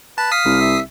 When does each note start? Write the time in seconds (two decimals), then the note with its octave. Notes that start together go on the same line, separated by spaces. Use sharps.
0.18 B4 A5
0.32 F5 D#6 B6 C7
0.45 C2
0.61 E5